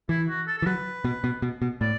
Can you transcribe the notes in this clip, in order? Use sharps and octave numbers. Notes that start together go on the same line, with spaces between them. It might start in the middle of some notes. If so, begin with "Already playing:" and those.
E3 E4
F#4
A4
A4
E3
F#3 B4
B2
B2
B2
B2
A2 D5